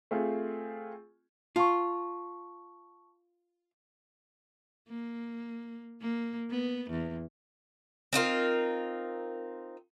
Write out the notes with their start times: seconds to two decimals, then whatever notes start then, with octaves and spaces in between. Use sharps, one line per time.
0.11 A3 C4 F4 G#4
1.56 F4 A5 C#6
4.89 A#3
6.01 A#3
6.51 B3
6.90 E2
8.13 C4 D#4 F4 A#4